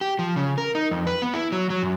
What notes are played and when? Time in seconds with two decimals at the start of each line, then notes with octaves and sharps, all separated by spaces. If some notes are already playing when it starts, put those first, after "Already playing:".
0.01 G4
0.19 F3
0.36 C#3
0.58 A#4
0.75 D#4
0.91 F2
1.07 B4
1.22 B3
1.34 E4
1.52 F#3
1.70 F#3
1.83 F#2